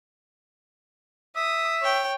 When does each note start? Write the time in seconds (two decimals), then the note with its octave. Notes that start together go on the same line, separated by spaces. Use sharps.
1.36 E5 D#6
1.82 C#5 G5